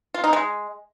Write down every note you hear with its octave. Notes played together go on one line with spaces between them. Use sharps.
F4
D#4
G#3